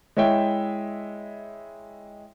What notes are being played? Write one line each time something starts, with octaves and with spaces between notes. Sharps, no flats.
G#3 E4 C#5 E5 G5